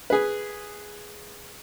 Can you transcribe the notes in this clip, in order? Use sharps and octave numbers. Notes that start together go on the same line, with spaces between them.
G#4 B4